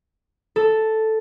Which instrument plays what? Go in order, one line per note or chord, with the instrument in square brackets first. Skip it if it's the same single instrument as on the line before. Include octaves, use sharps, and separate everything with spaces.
[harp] A4